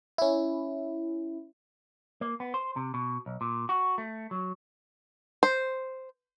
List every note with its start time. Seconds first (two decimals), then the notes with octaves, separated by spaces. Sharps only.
0.18 C#4 E4
2.21 A#3
2.40 B3
2.54 C5
2.76 C3
2.94 B2
3.26 B1
3.41 A#2
3.69 F#4
3.98 A3
4.31 F#3
5.43 C5